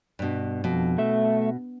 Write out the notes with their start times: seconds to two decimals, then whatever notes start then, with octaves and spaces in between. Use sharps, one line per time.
0.19 G2 B2
0.64 F2 B2
0.98 A3 E5